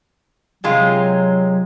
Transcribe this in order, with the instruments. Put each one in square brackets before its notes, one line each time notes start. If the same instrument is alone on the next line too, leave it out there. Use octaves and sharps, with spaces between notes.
[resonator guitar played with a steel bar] C3 G#3 F4 [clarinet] F#3